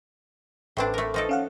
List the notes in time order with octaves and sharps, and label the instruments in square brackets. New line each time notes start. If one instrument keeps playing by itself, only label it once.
[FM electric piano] A1 B4 [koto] A2 C4 D4
[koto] A3 A#4
F3 D#4 A4
[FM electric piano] C#4 F5 F#5